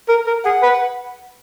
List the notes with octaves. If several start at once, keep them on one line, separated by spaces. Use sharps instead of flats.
A#4
A#4
G#4 F#5
B4